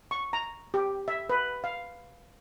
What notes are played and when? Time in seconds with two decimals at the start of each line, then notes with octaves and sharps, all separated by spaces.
0.11 C#6
0.33 A#5
0.74 G4
1.08 E5
1.30 B4
1.64 F5